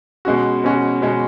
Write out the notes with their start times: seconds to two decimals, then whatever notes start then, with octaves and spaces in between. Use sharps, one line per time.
0.25 B2 G#3 C#4 F#4
0.64 B2 G#3 C#4 F#4
1.02 B2 G#3 C#4 F#4